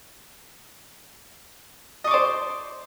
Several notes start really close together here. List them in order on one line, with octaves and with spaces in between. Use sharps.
D#5 C#6 D5 C5